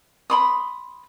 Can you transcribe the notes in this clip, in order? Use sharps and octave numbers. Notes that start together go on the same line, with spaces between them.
B5 C6 D#6